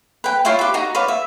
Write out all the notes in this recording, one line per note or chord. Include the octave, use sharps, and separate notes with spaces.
B4 G5
E4 F4 C#5 F5
G4 B4
D#4 F#4 A#5
B4 C#5 D5 F5
E5